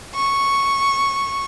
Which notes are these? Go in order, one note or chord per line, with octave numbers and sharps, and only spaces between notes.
C#6